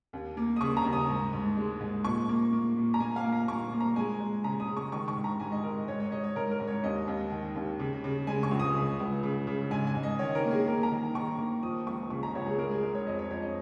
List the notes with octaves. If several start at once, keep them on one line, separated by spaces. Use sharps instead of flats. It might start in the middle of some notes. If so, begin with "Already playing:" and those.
D#2
A#3
D#6
C#3 C#6
A#5
D#2
D#6
G#2
G#2
G#3
G#2
A#2 C#6
A#3
A#3
A#2
A#5
A#3 G#5
F5
A#3
A#5
A#2 C#6
A#3
A#5
G#3 G#5
G#3
C#3 A#5
D#6
G#3
C#6
D#3 C#6
C#6
G#2
A#5
G#2 G#5
D#5
G#2 A#4
G#2 C#5
C#5
G#2 D#5
C#5
G#2 A#4
A#4
G#2
C#5
D#2 D#5
D#2
D#3
D#2
C#3
C#3
G#3 G#5
C#6
C#2
D#6
C#3
C#2
C#3
C#3
G#2 G#5
G#5
G#2
D#5
D#3 C#5
A#4
A#3
G#4
A#3 A#4
A#5
D#3
D#3 C#6
A#3
F3 D#6
C#2 C#6
C#3 C#6
A#5
C#2 C#5
G#4
G#3 A#4
G#4
G#3 A#4
C#5
F2 D#5
C#5
F2 C#5
D#5